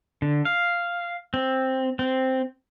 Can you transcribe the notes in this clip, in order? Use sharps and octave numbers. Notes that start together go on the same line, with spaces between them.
D3
F5
C4
C4